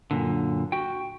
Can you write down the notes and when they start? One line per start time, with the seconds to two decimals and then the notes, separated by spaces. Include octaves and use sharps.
0.11 F#2 A#2 D3
0.72 F#4 G5